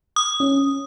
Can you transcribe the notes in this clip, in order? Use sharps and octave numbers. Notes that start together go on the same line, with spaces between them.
D#6
C#4